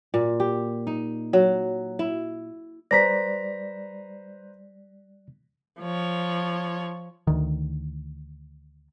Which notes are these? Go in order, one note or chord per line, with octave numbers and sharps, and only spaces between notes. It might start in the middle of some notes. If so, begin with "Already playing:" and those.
A#2
G4
D#4
F#3
E4
G3 B4 C5 D5 A#5 A#6 B6
F3 C#5
D2 D#3